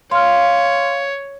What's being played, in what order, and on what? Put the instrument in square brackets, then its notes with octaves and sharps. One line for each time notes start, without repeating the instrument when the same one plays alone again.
[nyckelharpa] C#5 [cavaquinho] F5 [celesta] C6 F6